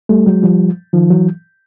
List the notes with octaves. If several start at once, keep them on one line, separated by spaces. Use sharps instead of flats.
G3 A3
F#3 G#3
F3 G3
D#3 F3
E3 F#3